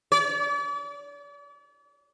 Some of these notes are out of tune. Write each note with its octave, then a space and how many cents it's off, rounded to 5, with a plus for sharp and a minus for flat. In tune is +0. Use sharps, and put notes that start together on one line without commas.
D5 -40